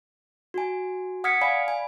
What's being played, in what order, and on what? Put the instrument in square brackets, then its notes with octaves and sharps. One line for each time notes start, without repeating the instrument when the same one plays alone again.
[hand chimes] F#4 G#5
F#5 D#6 F6 G#6 B6 C#7
D5 F5 G#5 B5
G#5